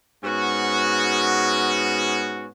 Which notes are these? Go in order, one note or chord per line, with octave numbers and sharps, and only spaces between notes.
G#2 B3 C#4 F#4